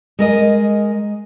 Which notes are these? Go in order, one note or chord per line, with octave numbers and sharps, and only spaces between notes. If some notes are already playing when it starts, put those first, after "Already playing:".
G#3 A#4 D#5